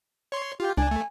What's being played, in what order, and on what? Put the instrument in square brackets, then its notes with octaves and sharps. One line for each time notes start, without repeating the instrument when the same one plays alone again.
[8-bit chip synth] C#5 C6
[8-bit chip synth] F4 [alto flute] G4
[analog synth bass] C#2 [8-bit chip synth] D4 [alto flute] G#5
[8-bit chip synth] A3